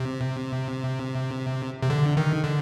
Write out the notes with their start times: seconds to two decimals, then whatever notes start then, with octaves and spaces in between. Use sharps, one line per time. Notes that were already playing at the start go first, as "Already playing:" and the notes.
Already playing: C3
1.82 C3
1.90 D3
2.17 D#3
2.44 D3